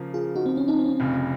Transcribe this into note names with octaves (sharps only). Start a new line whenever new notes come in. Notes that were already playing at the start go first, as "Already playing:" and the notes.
Already playing: C#3 F3 A#3
F4 G#4
D#4 F#4
C4
C#4
C4 D#4
C4
C#4
C4
F1 F2 C#3